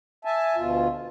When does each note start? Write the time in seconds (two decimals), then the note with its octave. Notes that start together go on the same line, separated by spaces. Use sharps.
0.25 E5 G#5 A5
0.56 D2 B2 F4